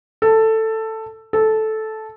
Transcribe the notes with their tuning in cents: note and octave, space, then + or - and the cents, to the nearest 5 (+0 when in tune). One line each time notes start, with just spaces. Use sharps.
A4 +10
A4 -10